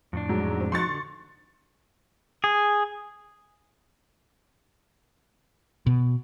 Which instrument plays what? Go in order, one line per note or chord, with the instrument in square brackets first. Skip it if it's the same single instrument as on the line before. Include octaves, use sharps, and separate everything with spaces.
[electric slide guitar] F2 A2 D4
[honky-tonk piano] G#2 F#3
C4
[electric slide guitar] F3 D#4 F#4 [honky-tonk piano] C6 C#6 A6
[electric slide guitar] D3
[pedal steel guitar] G#4
[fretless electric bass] B2